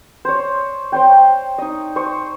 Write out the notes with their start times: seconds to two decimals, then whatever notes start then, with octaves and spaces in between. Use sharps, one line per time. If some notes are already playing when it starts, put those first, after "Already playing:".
0.25 C5 C#5
0.92 C5 C#5 G5
1.58 D#4 D#5
1.96 C5 C#6